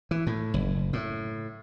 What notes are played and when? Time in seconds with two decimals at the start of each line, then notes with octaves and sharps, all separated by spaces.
0.11 E3
0.27 A2
0.54 F#1
0.93 A2